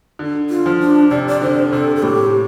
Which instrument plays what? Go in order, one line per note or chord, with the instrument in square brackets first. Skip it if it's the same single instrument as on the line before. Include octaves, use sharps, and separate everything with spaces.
[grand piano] D3
[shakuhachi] F4
[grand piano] F3
[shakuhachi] D4
[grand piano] C3 [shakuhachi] D5
[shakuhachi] D5
[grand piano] D3 [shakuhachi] C5
[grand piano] C3 [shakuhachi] A4
[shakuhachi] A4
[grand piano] A2 [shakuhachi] G4